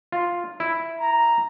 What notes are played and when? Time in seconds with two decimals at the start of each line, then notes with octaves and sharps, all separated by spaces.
0.12 F4
0.60 E4
1.01 A#5